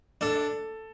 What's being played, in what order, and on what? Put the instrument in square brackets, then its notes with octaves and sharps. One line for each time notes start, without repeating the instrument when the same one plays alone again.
[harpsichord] D4 [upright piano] A4